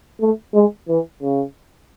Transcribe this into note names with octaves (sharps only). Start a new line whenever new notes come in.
A3
G#3
E3
C#3